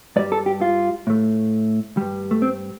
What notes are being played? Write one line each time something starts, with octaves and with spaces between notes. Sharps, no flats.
G2 G3 D5
A4
G4
F4
A2 A3
G2 G3
A3
C4